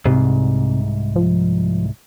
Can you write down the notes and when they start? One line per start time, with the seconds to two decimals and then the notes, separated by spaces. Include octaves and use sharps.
0.05 C2 G#2 C3
1.16 F3